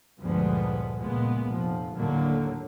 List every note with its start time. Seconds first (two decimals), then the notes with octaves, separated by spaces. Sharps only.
0.22 D2 G2 A#2 F3 G#3 B3
0.98 C#2 A#2 G#3 B3
1.47 F1 F3
1.95 D#2 A2 D3 F#3 A#3